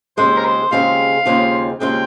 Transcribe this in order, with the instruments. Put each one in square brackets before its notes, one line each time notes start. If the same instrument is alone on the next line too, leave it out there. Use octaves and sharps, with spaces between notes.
[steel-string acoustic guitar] D#2 C#3 G#3 C4 F4 [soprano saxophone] C5
[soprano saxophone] A#4
C5
[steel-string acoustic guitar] D#2 C#3 G#3 C4 F4 [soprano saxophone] F5
[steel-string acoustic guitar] D#2 C#3 G#3 C4 F4
[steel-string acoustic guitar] D#2 C#3 G#3 C4 F4 [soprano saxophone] G5